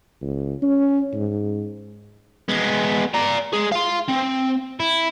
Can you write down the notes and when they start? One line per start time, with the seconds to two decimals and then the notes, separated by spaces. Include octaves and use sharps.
0.22 C#2
0.62 C#4
1.14 G#2
2.49 G#3 B3
3.14 D5 A#5
3.53 G#3 G#4
3.72 F5 C6
4.08 C4
4.80 E4